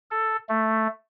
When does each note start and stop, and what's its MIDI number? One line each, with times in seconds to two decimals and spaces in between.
0.11 0.37 69
0.49 0.87 57